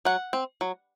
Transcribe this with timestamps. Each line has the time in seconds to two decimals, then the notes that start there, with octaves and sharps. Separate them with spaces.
0.05 F#3 F#5
0.33 C4
0.61 F#3